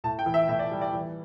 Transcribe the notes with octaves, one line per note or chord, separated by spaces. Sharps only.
A2 A5
G5
E3
E5
A2 E5
D5
G3
D5
E3